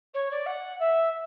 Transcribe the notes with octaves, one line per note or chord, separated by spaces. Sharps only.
C#5
D5
F#5
E5